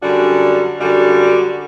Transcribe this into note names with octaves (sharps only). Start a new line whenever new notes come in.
F#2 D3 G3 D4 F#4
F#2 D3 G3 D4 F#4